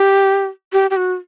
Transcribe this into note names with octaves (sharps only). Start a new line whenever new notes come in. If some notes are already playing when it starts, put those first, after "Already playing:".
Already playing: G4
G4
G4
F#4